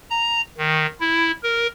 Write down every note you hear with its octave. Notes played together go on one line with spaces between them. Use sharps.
A#5
D#3
E4
A#4